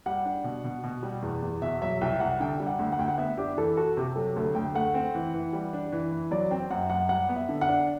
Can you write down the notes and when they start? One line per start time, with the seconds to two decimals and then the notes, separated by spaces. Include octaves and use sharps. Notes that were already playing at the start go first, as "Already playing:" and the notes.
0.06 G3 F#5
0.25 D4
0.44 B2
0.64 B2
0.84 B2
1.03 G3
1.22 E2
1.42 E2
1.62 B2 E5
1.81 F#3 E5
2.01 C2 G5
2.20 C2 F#5
2.40 D3 G5
2.60 G3
2.67 F#5
2.79 D2
2.92 F#5
2.99 D2 G5
3.08 F#5
3.18 B3 E5
3.37 D4 G4
3.57 E3 A4
3.77 F#4 A4
3.97 C3 G4
4.16 F#3 A4
4.36 D2 A4
4.55 D2 G5
4.75 A3 F#5
4.94 C4
5.14 E3
5.34 E3
5.53 G3
5.73 D4
5.92 E3
6.12 E3
6.31 F#3 D5
6.51 C4 G5
6.71 F#2 F#5
6.90 F#2 F#5
7.09 G3 F#5
7.29 B3
7.36 E5
7.49 D3
7.61 F#5
7.69 D4